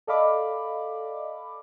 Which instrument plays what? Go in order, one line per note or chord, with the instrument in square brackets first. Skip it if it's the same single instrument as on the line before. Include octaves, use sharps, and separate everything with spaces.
[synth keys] A4 D5 D#5 F5 B5 D6